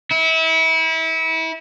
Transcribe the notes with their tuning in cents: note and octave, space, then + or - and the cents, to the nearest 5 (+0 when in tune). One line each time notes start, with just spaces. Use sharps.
E4 -30